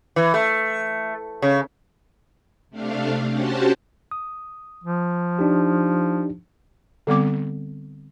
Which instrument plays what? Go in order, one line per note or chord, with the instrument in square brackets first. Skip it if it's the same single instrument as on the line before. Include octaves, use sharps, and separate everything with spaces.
[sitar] E3
A3
C#3
[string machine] C3 A3 D4 F5
C#4 F#4 G4 C5 A5
[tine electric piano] D#6
[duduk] F3
[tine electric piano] D4 D#4 G4
[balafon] D3 G3 B3 C4 D6